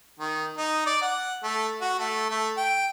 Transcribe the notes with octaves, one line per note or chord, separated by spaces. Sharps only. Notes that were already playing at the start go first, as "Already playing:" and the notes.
D#3
D#4
D5
F#5
A3
F#4
A3
A3
G5